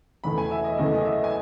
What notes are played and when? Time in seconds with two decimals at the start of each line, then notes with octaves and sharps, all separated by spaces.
0.24 E1 E2 C#3 E3 A3 B5
0.38 G#5
0.51 E5
0.65 D#5
0.78 F#1 E2 C#3 E3 A3 D#5
0.98 D#5
1.05 E5
1.24 G#5